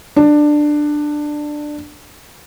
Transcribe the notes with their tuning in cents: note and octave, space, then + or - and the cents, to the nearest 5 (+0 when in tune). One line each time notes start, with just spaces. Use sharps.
D4 +15